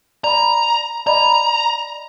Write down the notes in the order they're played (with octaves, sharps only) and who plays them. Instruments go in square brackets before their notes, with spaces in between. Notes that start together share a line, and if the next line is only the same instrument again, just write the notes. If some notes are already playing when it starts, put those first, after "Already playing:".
[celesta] D5 B5 [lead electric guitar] A#5
[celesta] D5 D#5 B5 [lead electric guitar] A#5